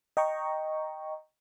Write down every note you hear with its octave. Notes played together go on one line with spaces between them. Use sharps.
D#5 G5 A#5 C#6